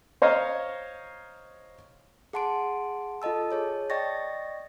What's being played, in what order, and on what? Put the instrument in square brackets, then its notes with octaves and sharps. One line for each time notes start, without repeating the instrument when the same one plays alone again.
[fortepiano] C5 C#5 D#5 F5 A#5
[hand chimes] G#4 F#5 A5 C6 D7
F4 A4 D#5 A5 E6
G#4 C#5 A5
D5 D#5 G5 C#6 A6 A#6